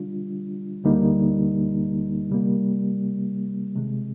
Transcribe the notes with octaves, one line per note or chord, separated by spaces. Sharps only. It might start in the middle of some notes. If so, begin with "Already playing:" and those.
Already playing: D3 G3 D4 F4
D2 D3 G3 A#3 D#4
C3 G3 A#3
C3 D#3 G#3